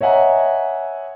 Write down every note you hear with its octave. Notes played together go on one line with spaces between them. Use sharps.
C#5 D#5 E5 F#5 G#5 A#5